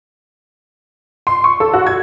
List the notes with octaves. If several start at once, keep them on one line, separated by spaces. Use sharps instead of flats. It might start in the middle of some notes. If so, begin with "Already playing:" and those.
C6
C#6
A4
F#4
G#6